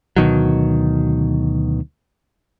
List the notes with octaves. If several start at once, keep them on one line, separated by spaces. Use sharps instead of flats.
D2 B2 D#3 F#3